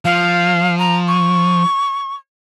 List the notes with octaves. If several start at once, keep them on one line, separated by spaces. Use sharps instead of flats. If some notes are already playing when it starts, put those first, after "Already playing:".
F3 F5
A#5
C#6